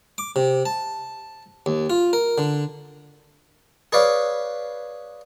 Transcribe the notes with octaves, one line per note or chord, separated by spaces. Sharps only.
D6
C3
A5
D#2
F4
A#4
D3
G#4 B4 C#5 D5 F5